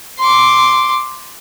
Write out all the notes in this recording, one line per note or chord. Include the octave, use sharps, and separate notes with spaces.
C6 D6